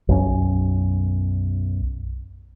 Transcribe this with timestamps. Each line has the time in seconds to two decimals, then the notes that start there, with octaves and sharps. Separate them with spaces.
0.09 B1 F#2 F#3 C#4